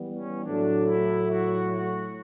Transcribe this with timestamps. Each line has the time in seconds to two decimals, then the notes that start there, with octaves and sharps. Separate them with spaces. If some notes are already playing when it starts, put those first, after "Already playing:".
Already playing: E3 G3 B3
0.17 C#4
0.44 A2 F#3 A3 D4
0.87 E4
1.30 F#4
1.72 F#4